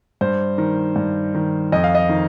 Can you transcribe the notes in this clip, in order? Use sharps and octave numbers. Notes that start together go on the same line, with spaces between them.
G2 C5
D#3
G2
D#3
F2 D#5
F5
D#5
D#3